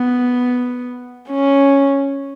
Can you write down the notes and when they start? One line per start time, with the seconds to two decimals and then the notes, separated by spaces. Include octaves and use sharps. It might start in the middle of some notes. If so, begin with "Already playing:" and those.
Already playing: B3
1.30 C#4